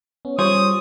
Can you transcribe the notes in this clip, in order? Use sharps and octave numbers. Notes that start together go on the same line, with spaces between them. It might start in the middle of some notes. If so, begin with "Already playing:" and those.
B3 C#4
G3 F4 G#4 C5 C#5 D#6